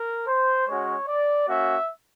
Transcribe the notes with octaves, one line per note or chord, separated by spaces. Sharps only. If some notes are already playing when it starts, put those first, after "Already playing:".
Already playing: A#4
C5
G#3 C#4 F#4 C#5
D5
A#3 C#4 F#4 E5